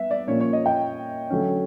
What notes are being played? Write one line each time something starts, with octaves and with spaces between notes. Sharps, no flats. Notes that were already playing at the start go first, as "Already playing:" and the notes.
Already playing: G3 B3 E5
D5
A#2 F3 A#3 C#4 C#5
C#5
D#5
G5
D3 F#3 A3 C#4